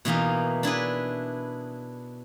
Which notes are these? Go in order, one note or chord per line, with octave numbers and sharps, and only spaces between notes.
B2 E3 A#3 D#4
D4 E4 G#4 B4